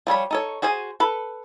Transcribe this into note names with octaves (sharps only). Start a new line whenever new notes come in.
F3 G3 C#5 B5
D#4 A4 C#5
F#4 G#4 C5 G#5
A4 B4